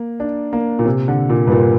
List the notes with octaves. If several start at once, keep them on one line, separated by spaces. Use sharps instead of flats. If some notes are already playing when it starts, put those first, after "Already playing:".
Already playing: A#3
D4
A#3
A#2
C3
D3
A#2
G2
A#2